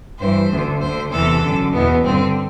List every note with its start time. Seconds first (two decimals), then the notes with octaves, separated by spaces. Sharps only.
0.19 G2 E3 C5
0.50 D2 D3
0.81 D2 D3 C5
1.11 E2 C3 E3 A4
1.42 F#2 D3
1.72 E2 B2 B3
2.03 G2 D3 C4